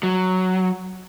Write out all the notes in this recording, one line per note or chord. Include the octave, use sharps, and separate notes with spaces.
F#3